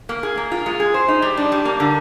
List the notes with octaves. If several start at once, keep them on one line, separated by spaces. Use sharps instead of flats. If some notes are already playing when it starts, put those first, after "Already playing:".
A#3
G#4
A#3
F4
G#3
G#4
C5
D#4
G3
D4
G3
A#3
D3